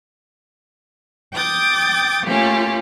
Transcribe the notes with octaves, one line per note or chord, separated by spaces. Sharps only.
G5 D6 D#6 G6 A6
A3 A#3 C#4 F4 G4